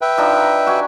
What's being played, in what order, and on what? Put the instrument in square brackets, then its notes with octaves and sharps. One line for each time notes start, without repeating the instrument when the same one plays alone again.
[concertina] B4 E5 G5
[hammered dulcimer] F3 D4 D#4
F#4 G4 G#5